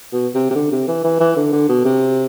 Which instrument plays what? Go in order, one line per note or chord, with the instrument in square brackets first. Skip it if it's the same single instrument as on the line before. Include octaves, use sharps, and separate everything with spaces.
[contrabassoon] B2
C3
C3
D3
C3
E3
E3
E3
D3
D3
B2
C3